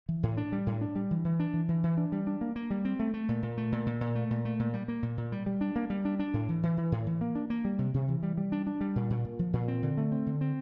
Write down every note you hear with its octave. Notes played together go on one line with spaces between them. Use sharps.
E3
A2
D4
G3
A2
D4
G3
E3
E3
D4
E3
E3
E3
D4
G3
D4
A#3
A#3
G3
C4
A3
A3
A#2
A#2
A3
A#2
A#2
A#2
A3
A#2
A3
A#2
G3
A#3
A#2
A#2
G3
G3
D4
A#3
G3
D4
D4
A2
E3
E3
E3
A2
E3
A#3
D4
A#3
G3
C3
C3
E3
G3
G3
D4
D4
G3
A#2
A#2
A#2
F3
A#2
C4
D3
A3
C4
D3
C4